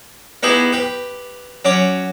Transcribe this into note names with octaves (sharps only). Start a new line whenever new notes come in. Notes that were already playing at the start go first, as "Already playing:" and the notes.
B3 D#4 E4 G4 G#4 B4
G4 B4
F#3 C#4 D6